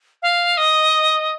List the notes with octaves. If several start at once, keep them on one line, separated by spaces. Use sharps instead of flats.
F5
D#5